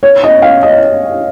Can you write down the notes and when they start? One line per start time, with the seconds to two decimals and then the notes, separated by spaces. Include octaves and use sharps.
0.03 C#5
0.24 D#5
0.42 F5
0.63 D#5